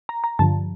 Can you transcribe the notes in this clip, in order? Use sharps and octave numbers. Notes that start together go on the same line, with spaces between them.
A#5
A#5
G2 D3 F3 A5